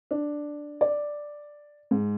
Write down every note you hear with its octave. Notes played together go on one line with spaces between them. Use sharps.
D4
D5
G#2